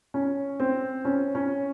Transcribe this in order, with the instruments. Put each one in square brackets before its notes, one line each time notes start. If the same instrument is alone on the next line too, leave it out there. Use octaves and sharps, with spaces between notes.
[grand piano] C#4
C4
C#4
C#4